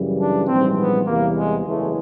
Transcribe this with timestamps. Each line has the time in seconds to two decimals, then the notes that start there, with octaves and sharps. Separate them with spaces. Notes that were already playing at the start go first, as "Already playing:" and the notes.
Already playing: F#2 C#3 E3 G3
0.19 D4
0.49 A#1 G#2 E3 G3 C4
0.78 B3
1.07 E2 C3 E3 G3 A#3
1.36 G#3
1.65 F#1 E2 C#3 E3 G#3 A3